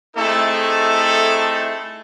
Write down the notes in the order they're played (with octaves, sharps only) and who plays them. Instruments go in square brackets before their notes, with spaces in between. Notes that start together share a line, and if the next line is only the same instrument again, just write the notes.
[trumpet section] A3 C4 D#4 E4 G#4 A4